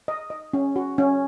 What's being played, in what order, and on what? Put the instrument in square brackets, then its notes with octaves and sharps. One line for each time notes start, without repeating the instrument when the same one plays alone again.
[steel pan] D#5
D#5
C#4
F#4
C#4